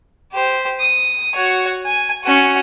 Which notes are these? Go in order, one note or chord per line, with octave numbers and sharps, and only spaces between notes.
G4 C5
D#6
F#4 C#5
G#5
C#4 F#4